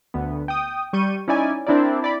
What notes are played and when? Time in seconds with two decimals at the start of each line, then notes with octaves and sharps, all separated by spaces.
0.14 D2 B3
0.48 G5 D#6
0.93 G3 C#6 G6 D#7
1.28 C#4 D#4 E4 D5 G#5
1.67 C4 D4 E4 A#4 D5
2.02 E4 D5 B5